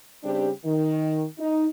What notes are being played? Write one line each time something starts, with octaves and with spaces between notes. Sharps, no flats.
C#3 G3 C4 D4 G4
D#3
D#4